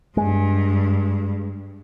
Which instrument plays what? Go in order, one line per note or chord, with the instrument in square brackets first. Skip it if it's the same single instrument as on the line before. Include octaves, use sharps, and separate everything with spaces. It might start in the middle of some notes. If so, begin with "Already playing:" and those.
[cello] G2 [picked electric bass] G#3